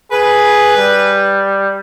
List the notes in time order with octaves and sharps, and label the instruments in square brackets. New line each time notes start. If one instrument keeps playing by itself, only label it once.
[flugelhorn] G#4 [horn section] B4
[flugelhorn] G3